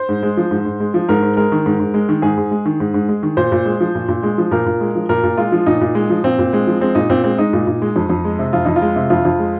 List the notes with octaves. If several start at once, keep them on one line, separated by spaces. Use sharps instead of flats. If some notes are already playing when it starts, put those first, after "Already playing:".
Already playing: C5
G#2
G#3
F3
G#2
G#2
G#3
F3
G#2 A#4
G#2
G#3 A#4
D#3
G#2
G#2
G#3
D#3
G#2 G#4
G#2
G#3
D#3
G#2
G#2
G#3
D#3
A#2 C5
A#2
G#3
F3
A#2
A#2
G#3
F3
A#2 A#4
A#2
G#3
F3
A#2 A#4
A#2
G#3 F4
F3
A#2 D#4
A#2
G#3
F3
A#2 C4
A#2
G#3
F3
G#3 C4
A#2 D#4
A#2 C4
G#3 C4
G#3 D#4
A#2
A#2
G#3
F2
F2
G#3
C3
F2 F4
F2 D#4
F4
G#3
C3
F2 F4
F2
G#3